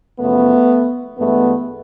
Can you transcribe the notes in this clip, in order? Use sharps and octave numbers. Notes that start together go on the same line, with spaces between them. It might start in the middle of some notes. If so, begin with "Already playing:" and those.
F#2 C#3 F3 A3 B3
G2 E3 G#3 A3 B3